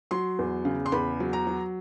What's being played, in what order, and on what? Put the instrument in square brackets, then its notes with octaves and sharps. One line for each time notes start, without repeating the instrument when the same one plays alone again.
[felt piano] F#3 C6
E2
C#3
C6
E2 B5
F#3
A#5
F#3